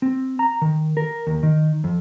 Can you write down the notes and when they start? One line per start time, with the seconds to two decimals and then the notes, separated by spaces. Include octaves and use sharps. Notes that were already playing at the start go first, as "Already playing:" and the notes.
0.02 C4
0.39 A#5
0.62 D#3
0.97 A#4
1.27 D#2
1.43 D#3
1.84 F2